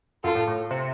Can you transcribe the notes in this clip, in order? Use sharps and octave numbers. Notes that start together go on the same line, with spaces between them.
F#2 F4 A4
A2
A2
C3